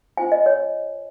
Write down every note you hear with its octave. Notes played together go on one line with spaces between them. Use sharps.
C#4 F4 C5 G#5
D#5
C#5